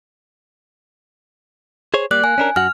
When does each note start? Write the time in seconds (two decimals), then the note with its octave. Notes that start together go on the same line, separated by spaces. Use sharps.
1.94 G#4 C5 C#5
2.11 G3 A#3 D5 F#6
2.24 A#3 G#5
2.38 C#4 D4 A#4
2.56 F#2 F#4 F#5 F6